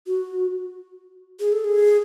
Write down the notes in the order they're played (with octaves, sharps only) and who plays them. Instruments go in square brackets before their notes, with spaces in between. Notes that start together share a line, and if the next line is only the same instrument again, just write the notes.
[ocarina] F#4
G#4
A4
G#4